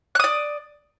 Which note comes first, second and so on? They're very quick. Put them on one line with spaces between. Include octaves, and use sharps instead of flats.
F#6 D#6 D5